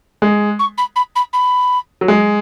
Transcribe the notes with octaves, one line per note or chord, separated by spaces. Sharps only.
G#3
C#6
B5
B5
B5
B5
F#3
G#3